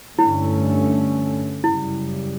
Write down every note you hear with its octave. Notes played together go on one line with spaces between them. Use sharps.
G2 D3 A3 C#4 E4
F#2 C#3 G3 E4